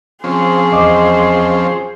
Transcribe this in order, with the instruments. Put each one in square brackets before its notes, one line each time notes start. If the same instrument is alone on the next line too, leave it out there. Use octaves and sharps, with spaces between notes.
[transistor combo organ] F3 C4 C#4 [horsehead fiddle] G#4 C5
[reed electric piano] E2 D#5 D6